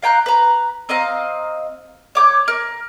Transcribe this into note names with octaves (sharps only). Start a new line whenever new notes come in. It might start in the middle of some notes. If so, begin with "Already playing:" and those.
F5 G5 A#5 F#6
B4 A#5
C4 D#5 F5 A#5
C#5 D6 G6
A#4